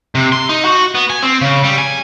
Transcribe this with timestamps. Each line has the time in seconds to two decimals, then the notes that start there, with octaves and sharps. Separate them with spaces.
0.15 C3
0.32 C6
0.49 D#4
0.65 F#4
0.95 B3
1.10 G#5
1.23 C4
1.41 C#3
1.64 G3
1.78 G#5